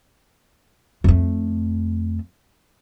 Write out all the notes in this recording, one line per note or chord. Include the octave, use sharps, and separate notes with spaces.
F2 A3